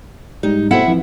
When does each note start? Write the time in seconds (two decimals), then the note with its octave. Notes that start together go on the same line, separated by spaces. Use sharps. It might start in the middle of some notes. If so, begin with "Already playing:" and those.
0.43 G#2 G3 D#4
0.71 B2 A3 C4 E4 E5 F#5
0.88 F2 E3